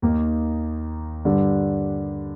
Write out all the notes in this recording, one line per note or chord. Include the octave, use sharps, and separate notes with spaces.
D#2 D#3 A#3 D#4
G2 D3 G3 D4